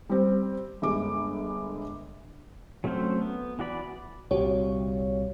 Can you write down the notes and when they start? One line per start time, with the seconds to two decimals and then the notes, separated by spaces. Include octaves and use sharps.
0.10 G3 C4
0.82 G1 G#3 D6
2.84 F#3 A3 C4 C#4 C5
3.21 B3
3.59 E3 F#4 D5 B5
4.31 C2 A#2 F#4 G4 C#5